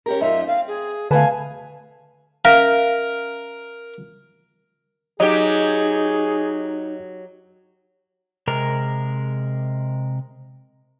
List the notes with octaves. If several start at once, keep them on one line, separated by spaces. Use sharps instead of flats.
C#4 G4 A#4
F#2 D#4 F4 E5
C4 F5
G#4
D3 A3 B4 F5 G#5 A5
C#4 A#4 E5 F5
F#3 D#4 G4 G#4 D#5
C3 G#3 A#4